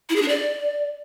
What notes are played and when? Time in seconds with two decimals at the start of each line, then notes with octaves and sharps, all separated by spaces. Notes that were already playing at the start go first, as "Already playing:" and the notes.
0.10 E4
0.16 G#4
0.22 D4
0.28 D5